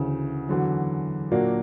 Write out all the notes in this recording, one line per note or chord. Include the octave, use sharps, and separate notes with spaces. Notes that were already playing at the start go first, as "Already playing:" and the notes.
Already playing: D2 C#3 E3
E2 D3 F#3
A#2 F#3 A#3 D4 F#4